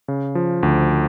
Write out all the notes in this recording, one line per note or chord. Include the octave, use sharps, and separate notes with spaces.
C#3
F3
D2